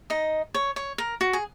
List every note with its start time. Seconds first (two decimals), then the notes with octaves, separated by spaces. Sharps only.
0.10 D#4 D#5
0.54 C#5
0.76 C#5
0.98 A#4
1.21 F#4
1.33 G#4